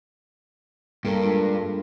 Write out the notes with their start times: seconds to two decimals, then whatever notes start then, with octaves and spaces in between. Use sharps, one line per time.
1.05 G2 A#3 A4 A#4
1.24 G#3 D4 F4